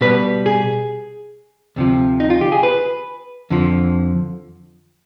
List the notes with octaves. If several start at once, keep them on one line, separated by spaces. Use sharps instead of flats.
B2 G3 B3 B4
G#4
D2 C3 F3
D#4
F4
G4
G#4
B4
F2 D3 F3